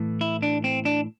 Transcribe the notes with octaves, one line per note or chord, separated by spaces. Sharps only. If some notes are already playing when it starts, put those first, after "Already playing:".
Already playing: A2 E3 A3
E4
D4
C4
D4